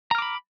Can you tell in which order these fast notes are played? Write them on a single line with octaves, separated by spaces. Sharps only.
A#5 F6 D6 B5